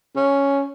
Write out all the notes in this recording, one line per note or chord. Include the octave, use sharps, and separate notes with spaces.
C#4